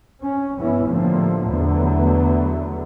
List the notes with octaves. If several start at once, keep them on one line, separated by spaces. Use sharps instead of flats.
C#4
G2 E3 B3 C#4
A2 D3 F3 G3 A3 A#3
E2 D3 F#3 A3 B3